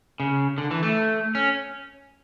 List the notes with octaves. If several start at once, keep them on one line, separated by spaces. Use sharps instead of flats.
C#3
D3
E3
A3
C#4